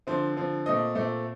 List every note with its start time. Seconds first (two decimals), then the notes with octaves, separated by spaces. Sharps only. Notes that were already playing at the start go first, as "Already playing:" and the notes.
0.07 D3 F3 C4 C5
0.37 D3 F3 C4
0.66 A#2 A3 C4 D#5
0.95 A#2 A3 C4